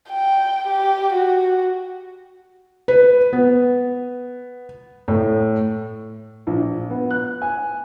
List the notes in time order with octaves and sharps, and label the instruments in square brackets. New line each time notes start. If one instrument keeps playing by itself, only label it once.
[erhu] G5
G4
F#4
[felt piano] B4
B3
A2
[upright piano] A#1
B3
F#6
G#5